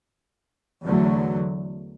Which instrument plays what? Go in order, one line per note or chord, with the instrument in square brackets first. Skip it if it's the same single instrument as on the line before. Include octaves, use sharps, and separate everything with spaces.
[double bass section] E2 D3 F#3 A3